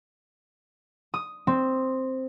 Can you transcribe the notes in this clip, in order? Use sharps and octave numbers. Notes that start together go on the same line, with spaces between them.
D#6
C4